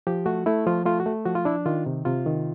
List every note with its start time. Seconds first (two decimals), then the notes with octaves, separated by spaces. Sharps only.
0.07 F3 G4
0.26 A3 F#4
0.46 A3 E4
0.66 F3 F4
0.85 A3 F4
1.00 F#4
1.06 A3
1.25 F3 F#4
1.35 F4
1.45 D4 E4
1.66 D#3 F4
1.86 C3
2.05 C3 F4
2.26 D#3